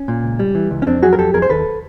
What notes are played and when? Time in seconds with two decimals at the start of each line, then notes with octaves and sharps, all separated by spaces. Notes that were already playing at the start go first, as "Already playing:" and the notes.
Already playing: C#4
0.08 A#2
0.24 C#2
0.39 G3
0.55 E3
0.71 C#2
0.82 C#4
0.86 F2 C4 D4
1.02 F#3 F#4 G#4
1.13 A#4
1.18 F2 G4 A4
1.34 F2 G#4 A#4
1.42 C5
1.50 D#2 A4 B4